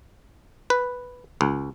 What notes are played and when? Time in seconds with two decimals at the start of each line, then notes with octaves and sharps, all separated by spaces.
0.70 B4
1.41 C#2